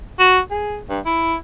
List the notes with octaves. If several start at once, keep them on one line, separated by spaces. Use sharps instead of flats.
F#4
G#4
G2
E4